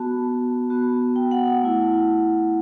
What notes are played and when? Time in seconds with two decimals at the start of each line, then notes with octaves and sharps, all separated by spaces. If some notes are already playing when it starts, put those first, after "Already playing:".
Already playing: B3 F#4 A5
0.70 B3 F#4
1.16 G5
1.31 F#5
1.46 F#5
1.61 A3 E4